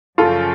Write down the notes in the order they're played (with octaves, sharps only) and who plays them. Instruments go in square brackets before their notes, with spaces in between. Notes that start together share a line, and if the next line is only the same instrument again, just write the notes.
[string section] F#2 C#3 F3 [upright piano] F4 A4